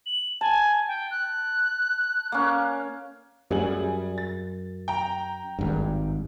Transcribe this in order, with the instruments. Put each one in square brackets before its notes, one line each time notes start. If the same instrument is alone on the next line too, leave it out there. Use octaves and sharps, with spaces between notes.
[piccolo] F#7
[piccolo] G#5 [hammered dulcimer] A5
[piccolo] G5
F#6
[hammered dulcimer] A#3 C#4
[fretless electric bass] F#2 [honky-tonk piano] G3 G#4 F#7
[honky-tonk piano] A6
G5 A#5
[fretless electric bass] G#1 G2